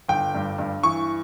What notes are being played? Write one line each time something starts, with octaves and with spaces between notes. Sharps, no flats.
G1 G5
G2
G2
E3 C#6